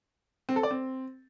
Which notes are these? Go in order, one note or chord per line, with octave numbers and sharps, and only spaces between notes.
C4
A4
D5
C4